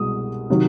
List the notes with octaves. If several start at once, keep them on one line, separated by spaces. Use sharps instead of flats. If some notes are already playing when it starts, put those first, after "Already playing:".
Already playing: C2 B2 G#3 D#6
C3 D#3 F#3